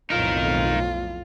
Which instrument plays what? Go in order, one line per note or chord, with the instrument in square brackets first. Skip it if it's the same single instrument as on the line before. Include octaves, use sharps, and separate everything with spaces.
[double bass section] B1 F2 A2 [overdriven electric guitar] D#4 A#4 [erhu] F4